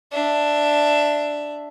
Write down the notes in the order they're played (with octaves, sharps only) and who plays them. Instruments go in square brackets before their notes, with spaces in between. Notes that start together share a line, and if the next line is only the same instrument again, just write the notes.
[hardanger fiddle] D4 E5